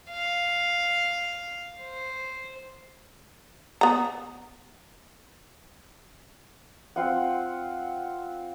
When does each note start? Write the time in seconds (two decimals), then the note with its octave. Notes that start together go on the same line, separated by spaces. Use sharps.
0.11 F5
1.81 C5
3.81 B3 A#5
6.96 C4 F4 F#5